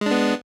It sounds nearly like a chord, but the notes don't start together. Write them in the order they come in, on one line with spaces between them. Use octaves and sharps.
G#3 D4 B3